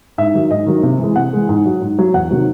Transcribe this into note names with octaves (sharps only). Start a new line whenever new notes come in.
G#2 E5
D#3 F#3
G#2 D#5
D#3 F#3
C3
E3 G#3
C3 F#5
E3 G#3
G#2
F#3
G#2
F#3
E2 F#5
C3 D#3 F#3